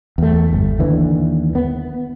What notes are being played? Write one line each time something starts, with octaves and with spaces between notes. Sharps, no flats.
E2 A3
G1
D#2 D3 E3
B3